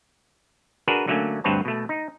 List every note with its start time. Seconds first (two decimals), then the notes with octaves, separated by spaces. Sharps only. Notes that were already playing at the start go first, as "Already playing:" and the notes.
0.88 D4 F#4 G#4 A#4 B4
1.08 D3 F#3 A3 A#3 C#4
1.44 D2 G2 C4 B4 C#5 A5
1.65 B2 A3
1.89 D#4